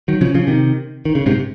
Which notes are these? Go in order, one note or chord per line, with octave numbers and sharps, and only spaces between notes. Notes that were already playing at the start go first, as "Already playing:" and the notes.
D#3 F#3
C#3 F3
C#3 F3
C3 D#3
D#3
C#3
G#2 C3